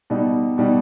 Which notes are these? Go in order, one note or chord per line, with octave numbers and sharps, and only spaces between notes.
B2 G3 D#4
B2 G3 D#4